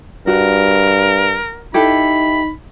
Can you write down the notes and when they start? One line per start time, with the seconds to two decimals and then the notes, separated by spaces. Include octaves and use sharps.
0.27 G2 F#4 A#4
1.74 D#4 E4 G4 A4 B5